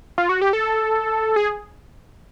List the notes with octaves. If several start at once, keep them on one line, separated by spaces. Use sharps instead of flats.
F4
F#4
G4
A4
G#4